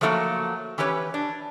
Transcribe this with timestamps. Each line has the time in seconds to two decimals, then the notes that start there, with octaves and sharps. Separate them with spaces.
0.01 F3 F#3 A3 A#3 E4 F#4
0.78 E3 C#4 G4 B4 C#5
1.14 D4